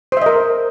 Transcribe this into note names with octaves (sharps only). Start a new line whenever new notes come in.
A#4 C5 D#5 E5